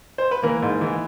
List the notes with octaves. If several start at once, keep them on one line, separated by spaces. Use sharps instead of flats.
C5
B4
E3 A#3 A#4
G#2
E3